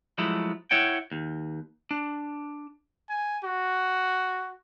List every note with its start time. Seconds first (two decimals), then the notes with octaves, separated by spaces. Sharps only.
0.18 F3 F#3 G#3 A3 E4
0.71 E4 C#5 F#5 G5
1.12 D#2
1.91 D4
3.09 G#5
3.44 F#4